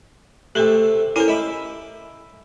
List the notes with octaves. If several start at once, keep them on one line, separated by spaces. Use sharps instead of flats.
C3 A3 G4 A4
C#4 E4 A4 A#4 C5
D#5 E5 B5 D6